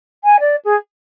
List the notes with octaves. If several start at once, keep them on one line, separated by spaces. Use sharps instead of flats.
G#5
D5
G#4